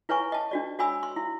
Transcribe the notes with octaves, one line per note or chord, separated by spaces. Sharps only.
E4 B4 C#5 G#5 C#6
D#5 A5
D4 F#4 D5
F#4 C#5 G#5 B5 E6
C6
E4